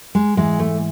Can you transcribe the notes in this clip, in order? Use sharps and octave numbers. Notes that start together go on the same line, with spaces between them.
G#3
G#2 E3 G#3
A3